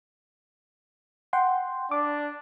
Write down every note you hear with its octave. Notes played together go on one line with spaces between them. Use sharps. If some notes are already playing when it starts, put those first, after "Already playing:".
F#5 G5 C6
D4 D6